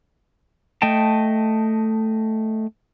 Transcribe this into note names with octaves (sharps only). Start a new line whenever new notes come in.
A3 D#5 G5 A5